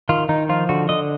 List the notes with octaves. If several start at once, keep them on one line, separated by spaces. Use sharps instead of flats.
D#3 F4
D#3 D#4
F3 F4
D3 F#4
D3 D#5